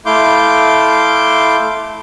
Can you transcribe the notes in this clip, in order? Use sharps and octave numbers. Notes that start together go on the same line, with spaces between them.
A3 E4 F5 C6 D6 G6